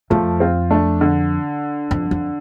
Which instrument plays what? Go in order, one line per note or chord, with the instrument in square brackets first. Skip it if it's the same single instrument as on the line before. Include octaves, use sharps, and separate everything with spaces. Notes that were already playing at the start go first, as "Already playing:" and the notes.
[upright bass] F2 [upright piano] F3 A3
[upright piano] C4 F4
A3 D4
D3
[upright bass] F2
F2